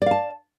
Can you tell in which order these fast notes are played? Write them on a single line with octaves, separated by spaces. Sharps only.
D5 F5 A5